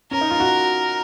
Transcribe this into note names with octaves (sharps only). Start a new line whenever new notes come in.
C#4 A#4
D#4
F4
F#4